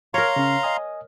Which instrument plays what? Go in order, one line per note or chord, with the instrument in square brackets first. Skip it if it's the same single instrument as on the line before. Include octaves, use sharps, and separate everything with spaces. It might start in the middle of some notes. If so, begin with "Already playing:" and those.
[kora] A#4 C#5 [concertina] F5 A#5 C6
[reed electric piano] C#3 C#4
D#5 G#5 D#6